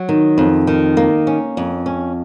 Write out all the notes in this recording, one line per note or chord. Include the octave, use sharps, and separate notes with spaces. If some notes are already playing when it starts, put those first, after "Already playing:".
Already playing: F#3
D#3
F2
D#3
A#3
C#4
F2
C#4